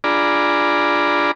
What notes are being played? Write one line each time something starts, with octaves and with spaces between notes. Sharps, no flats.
D4 F4 G#4 D5 A#5 B5